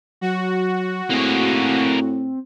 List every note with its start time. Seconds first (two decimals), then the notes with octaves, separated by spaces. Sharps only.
0.21 F#3 F#4
1.10 A2 A#3 C4 G#4